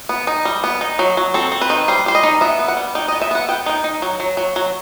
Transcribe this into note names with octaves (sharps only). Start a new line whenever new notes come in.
B3
D#4
G3
B3
D#4
F#3
F#3
C4 A4
C4
B4
D#3
G3 C5
G3 C5
D#5
D#4
B3 E5
B3
F#5
G3
D#4 G5
B3 D#5
E5
B3 F#5
B3 G5
D#4 G5
D#4
F#3
F#3
F#3
F#3